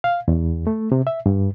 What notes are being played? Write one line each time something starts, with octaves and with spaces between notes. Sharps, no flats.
F5
E2
A3
C3
E5
G2